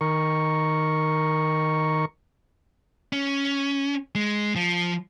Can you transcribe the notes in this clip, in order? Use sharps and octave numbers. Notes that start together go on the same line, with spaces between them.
D#3 A#4 C#6
C#4
G#3
F3